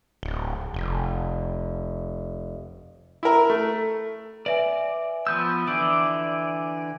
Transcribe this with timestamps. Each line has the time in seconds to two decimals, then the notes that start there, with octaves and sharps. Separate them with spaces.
0.23 D1
0.74 F1
3.23 E4 A#4
3.50 A3
4.46 B4 D5 E5 G#5
5.27 F3 B3 E6 G6
5.67 D3 E3 D5 E6